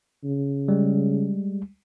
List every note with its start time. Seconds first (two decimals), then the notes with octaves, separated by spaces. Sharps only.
0.24 C#3
0.68 G3 G#3